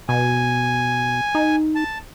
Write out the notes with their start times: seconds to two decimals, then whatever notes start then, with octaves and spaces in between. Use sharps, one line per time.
0.09 B2 G#5
1.35 D#4
1.75 A5